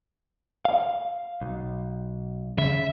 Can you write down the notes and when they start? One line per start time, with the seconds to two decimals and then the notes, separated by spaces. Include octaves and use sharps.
0.65 F5
1.41 B1
2.58 C#3 E5